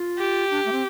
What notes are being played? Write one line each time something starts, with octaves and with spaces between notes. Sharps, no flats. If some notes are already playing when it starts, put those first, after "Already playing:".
Already playing: F4
G4
D4
A3
C4